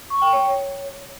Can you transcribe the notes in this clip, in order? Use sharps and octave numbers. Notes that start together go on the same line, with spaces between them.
C#6
G5
C#5